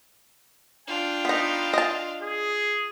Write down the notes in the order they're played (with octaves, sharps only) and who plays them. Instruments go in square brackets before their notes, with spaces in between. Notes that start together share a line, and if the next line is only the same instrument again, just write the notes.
[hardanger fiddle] D4 F4 [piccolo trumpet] G5
[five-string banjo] B3 D#4
D#5 A5
[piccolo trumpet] G#4